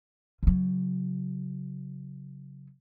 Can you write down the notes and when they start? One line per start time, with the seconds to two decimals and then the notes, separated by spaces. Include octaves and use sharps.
0.43 C#3 F#3